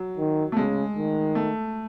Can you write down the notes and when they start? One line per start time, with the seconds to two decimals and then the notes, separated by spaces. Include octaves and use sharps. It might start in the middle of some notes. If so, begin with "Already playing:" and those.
Already playing: F#3
0.17 D#3
0.52 A3
0.57 C#3 G#3
0.96 D#3
1.35 A3